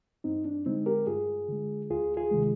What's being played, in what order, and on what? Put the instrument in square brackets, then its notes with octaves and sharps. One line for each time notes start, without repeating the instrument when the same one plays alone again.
[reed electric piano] G2 C4 D#4
D4
D3 G#3 C4 D#4
G4 A#4
G2 F4 G#4
D3 G#3
D2 F4 G#4
F4 G#4
C3 D#3 G#3